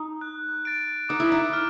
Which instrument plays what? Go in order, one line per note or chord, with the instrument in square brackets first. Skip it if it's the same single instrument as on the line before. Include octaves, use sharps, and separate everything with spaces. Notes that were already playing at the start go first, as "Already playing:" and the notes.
Already playing: [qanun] D#4
[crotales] F#6
A6 D7
[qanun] D#4 [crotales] D6
[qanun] E4
D#4
[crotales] F6